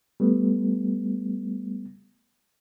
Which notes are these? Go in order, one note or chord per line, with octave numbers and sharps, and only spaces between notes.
G3 A3 B3